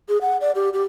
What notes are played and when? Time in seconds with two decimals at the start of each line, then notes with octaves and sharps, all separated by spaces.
0.09 G#4
0.21 F#5
0.41 D5
0.55 G4
0.73 G4